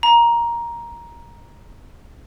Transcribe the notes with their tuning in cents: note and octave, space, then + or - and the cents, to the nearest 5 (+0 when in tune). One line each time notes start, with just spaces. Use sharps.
A#5 +10